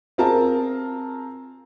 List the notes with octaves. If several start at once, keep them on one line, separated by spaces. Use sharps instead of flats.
C4 F4 G#4 A#4 A5